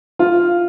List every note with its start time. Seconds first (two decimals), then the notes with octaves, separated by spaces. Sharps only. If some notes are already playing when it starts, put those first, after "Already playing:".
0.19 F4